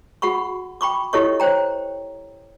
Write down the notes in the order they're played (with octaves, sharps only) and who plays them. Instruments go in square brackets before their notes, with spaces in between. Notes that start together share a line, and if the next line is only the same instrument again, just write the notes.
[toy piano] F#4 G#4 F#5 B5 C#6
G5 B5 C#6 D6
E4 G4 A4 C#5 D#5 C#6
C5 C#5 G5 A#5